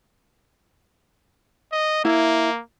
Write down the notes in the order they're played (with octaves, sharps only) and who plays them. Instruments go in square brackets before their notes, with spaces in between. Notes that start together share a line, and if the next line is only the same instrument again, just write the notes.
[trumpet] D#5
[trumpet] A#3 [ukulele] E4